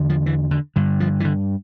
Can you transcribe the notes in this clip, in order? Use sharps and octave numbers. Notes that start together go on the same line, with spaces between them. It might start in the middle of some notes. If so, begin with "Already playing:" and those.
Already playing: E2 D3
F3
E3
D3
G2 D3
F3
E3
D3